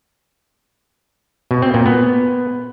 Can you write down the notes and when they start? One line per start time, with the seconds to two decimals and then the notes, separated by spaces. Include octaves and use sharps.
1.51 B2
1.62 C4
1.74 A#2
1.86 B3